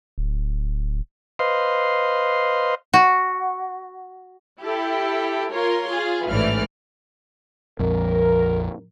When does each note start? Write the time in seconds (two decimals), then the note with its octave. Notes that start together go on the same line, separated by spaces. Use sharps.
0.18 D1
1.39 B4 C5 D#5 F5 C6
2.94 F#4
4.61 E4 G4 A4
5.51 F4 A#4 C#5 C6
5.90 F4 G#4
6.28 A1 G#2 E3 A3 D5 F6
7.79 A#1 F2 A#4